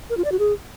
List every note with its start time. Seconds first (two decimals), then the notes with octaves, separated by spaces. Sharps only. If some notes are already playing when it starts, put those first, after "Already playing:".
0.10 A#4
0.17 F4
0.25 D5
0.32 F#4
0.39 G#4